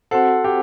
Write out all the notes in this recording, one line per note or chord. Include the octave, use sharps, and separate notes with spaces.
C4 F#4 A4 C5 F#5
G4